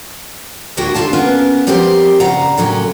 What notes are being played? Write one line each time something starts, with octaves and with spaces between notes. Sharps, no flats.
D2 A2 A#3 E4 F#4 G5
D3 D#3 G3 F4 F5 A5
A#3 B3 C#4 F4 A#4 B4
F3 G3 C4 G4 A#4 C5
A#2 C#3 F5 F#5 A#5
A2 C#3 F#3 A#3 F4